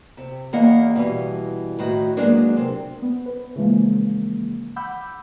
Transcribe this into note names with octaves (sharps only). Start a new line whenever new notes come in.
C3
E2 A#3 D#5 F#5
B2 E3 G3
A2 D#3 F#4
F#3 G#3 A#3 B3 D4
C3
B3
B4
C#3 E3 F3 G#3 A#3
F#5 B5 D6 E6 G6